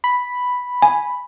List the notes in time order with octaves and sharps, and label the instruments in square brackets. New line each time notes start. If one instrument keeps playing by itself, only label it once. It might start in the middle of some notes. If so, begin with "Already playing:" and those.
[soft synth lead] B5
[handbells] G#5